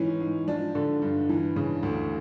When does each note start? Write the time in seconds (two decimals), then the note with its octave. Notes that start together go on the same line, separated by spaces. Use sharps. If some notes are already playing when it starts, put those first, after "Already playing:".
Already playing: G#2 E3 C#4
0.21 G#2
0.47 F3 D4
0.75 D3
1.02 G2
1.29 E3
1.56 C#3
1.83 D2